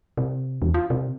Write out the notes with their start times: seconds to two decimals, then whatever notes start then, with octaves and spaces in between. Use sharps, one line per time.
0.17 C3
0.62 E2
0.74 F4
0.90 C3